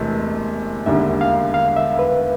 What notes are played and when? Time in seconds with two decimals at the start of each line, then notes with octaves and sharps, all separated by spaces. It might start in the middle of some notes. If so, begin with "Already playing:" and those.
Already playing: E1 E2 C3 E3 A3 D#5
0.86 E1 D#2 D3 G3 E5
1.21 F5
1.54 F5
1.76 E5
1.99 B4